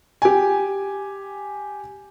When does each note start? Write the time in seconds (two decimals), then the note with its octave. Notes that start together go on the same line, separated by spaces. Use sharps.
0.22 G4 G#5